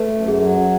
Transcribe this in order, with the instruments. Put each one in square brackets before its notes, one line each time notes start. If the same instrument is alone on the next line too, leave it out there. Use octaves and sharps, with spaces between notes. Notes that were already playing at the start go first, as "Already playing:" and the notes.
Already playing: [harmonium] A3 [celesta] B4
[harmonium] F#2
[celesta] G#4
[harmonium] F#3